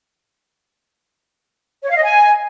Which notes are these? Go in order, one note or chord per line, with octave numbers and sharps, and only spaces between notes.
C#5
F5
D#5
G#5